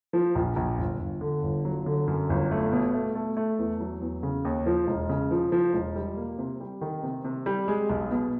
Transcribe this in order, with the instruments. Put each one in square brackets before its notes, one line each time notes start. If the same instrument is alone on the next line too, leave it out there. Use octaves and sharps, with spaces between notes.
[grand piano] F3
A#1
A#1
G1
G1
D3
G1
F#3
D3
F#2
G1
A3
B2
A3
A3
A3
E2
F#3
E2
C#3
D#2
F3
E1
C#3
F3
F3
E1
G3
A#3
C3
G3
D#3
C3
C3
G3
G#3
B1
B2